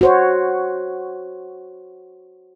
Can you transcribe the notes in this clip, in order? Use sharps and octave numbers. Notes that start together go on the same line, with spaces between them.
F#4 C5 C#5